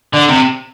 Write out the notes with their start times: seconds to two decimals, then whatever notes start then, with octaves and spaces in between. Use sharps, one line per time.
0.14 D3
0.29 C3